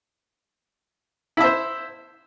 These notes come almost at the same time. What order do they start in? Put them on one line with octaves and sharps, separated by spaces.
E4 E5 C5